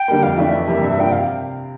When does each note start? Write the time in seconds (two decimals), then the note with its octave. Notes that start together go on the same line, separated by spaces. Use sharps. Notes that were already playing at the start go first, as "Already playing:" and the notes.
Already playing: G5
0.08 D3 G3 A#3
0.23 F2 F5
0.38 E3 A3 D4 E5
0.53 F2
0.67 C3 E3 G3 A#3
0.81 G2
0.97 F3 A#3 D4 G5
1.12 C3 F5